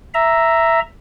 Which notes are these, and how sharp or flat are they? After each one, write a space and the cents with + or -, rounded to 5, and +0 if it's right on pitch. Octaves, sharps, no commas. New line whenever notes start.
E5 +5 A#5 +0